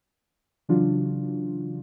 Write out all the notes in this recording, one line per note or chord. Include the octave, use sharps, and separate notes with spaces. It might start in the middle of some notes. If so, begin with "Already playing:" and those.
C#3 E3 F#3 D4 F4 F#4